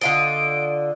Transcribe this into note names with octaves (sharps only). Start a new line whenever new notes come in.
D3 F4 D#5 D7